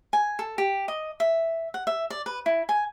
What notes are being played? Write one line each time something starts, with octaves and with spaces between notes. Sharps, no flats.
G#5
A4
G4
D#5
E5
F#5
E5
D5
B4
E4
G#5